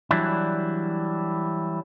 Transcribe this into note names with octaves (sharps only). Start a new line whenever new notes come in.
E3 F#3 G3 D4 E4